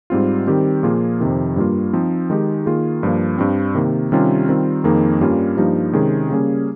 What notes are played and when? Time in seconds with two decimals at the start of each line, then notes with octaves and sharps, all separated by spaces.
0.10 G#2 G3 C4 F4
0.47 D#3 G3 C4 G4
0.83 A#2 F3 A#3 F4 G#4
1.20 F2 C3 D#3
1.56 G2 G3 A#3 F4
1.93 F3 C4 D#4
2.30 D#3 G#3 D#4 G4
2.66 D#3 A#3 F4 G#4
3.03 G2 F3 A#3
3.38 G2 G3 C4
3.75 C3 D#3 A#3
4.12 C3 D#3 G3 C#4 F4
4.48 D#3 G3 C4 F4
4.84 F2 D#3 A#3 D#4 G#4
5.21 G2 G3 A#3 C#4 F4
5.57 G2 F3 A#3 D#4 G4
5.93 C3 D#3 G#3 C#4 G#4
6.30 C#3 G3 A#3 C#4 G#4